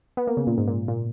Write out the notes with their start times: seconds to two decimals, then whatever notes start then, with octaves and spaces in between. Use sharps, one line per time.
0.17 B3
0.27 A#3
0.37 C#3
0.47 A#2
0.58 G#2
0.68 A#2
0.88 A#2